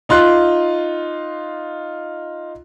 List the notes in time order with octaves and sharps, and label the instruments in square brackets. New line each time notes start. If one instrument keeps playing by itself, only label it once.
[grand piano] D#4 F4 C6 F#6